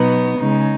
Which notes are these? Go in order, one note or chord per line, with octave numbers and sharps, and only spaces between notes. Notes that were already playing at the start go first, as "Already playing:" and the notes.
Already playing: B2 F#3 B3 D#4
C#3 G#3 D#4